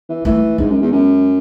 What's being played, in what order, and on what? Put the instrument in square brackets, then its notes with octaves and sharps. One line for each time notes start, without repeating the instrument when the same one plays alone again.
[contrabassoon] E3
[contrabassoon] E3 [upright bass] A3
[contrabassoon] G#2 [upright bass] G#3
[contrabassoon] F#2
E2
F#2